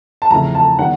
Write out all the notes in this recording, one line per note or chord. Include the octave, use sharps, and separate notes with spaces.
A5
E2 C#3 F3 A3 C4 A#5
A5
D#3 G3 B3 D4 F#5